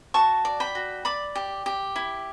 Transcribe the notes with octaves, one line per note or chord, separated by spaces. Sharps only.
F#4 A5 C#6
D5
G5 B5
F#4
D5 B5 D6
G4
G4
E4